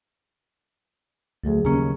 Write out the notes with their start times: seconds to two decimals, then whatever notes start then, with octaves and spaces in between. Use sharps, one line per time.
1.44 D2 F3 F#3 G#4
1.65 D#2 C#3 C#4 A#5